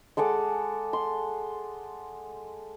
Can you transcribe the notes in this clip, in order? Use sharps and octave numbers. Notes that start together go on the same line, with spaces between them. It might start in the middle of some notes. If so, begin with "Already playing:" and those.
G#3 A4 F#5 D6
C6